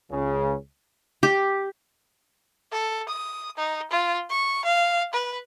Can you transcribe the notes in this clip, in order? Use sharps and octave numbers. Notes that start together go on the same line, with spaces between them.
C#2 C#3
G4
A4
D#6
D#4
F4
C#6
F5
B4